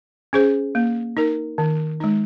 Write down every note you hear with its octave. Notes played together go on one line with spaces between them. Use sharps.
C#4 G#4 C5
A#3
D#4 A#4
D#3
G#3 D#4